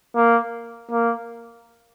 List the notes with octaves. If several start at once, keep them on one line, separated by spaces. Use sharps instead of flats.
A#3
A#3